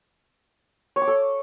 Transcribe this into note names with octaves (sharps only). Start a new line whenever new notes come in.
C#5
D6
A4